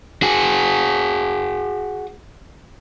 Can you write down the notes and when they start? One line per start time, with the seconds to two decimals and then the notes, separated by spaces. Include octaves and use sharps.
0.22 F#4 G#4